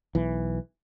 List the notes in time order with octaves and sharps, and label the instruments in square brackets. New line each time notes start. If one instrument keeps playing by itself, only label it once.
[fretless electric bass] B1 E3